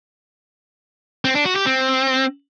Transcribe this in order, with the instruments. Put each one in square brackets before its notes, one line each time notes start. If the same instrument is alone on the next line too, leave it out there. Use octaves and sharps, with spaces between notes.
[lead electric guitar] C4
D4
F#4
G4
C4